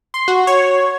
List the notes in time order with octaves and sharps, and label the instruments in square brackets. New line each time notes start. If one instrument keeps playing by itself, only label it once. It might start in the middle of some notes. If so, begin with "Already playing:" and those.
[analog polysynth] C6
F#4
C#5